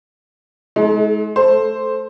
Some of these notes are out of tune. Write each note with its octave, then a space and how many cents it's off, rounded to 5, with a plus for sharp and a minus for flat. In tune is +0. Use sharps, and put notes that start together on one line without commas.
G#3 +30 D#4 +45 A4 -25
A3 -15 A4 +0 C5 +0